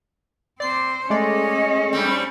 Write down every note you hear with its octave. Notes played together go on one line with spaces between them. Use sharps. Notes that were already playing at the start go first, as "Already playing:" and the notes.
C4 C5 D5 C7
G#3 A3 C#4 D5 D#5
G2 G3 C4